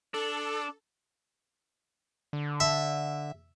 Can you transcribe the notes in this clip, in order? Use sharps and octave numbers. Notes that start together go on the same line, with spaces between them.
D4 A4
D3
E5